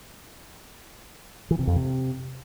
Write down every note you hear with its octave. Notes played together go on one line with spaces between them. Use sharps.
E3
C3
F2
C3